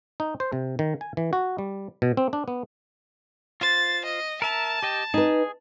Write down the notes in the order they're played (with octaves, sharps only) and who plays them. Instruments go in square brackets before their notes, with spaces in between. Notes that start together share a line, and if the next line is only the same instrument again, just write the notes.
[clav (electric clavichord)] D#4
C5
C3
D#3
G#5
E3
F#4
G3
B2
C4
D4
B3
[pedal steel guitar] F4 C5 [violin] A6
[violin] D#5
[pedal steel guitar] A#4 E5 A#5 [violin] A5
[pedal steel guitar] G4 D#5 G5
[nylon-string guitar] D#4 B4 [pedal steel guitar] G#4